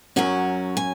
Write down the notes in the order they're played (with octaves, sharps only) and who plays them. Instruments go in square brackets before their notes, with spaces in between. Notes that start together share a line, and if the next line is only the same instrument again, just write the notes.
[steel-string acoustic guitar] F#2 F#3 C#4 F#4
G#5